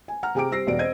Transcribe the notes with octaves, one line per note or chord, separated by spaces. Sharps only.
G#5
F#5 A#5 F6
C3 G#4 G5 A#5 D6 D7
G3 C4 E6 A#6 C7
E1 B2 D5 D7
C4 D#5 G#6 D#7